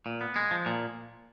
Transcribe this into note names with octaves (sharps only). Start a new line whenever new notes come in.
A#2
B3
G#3
F3
A#2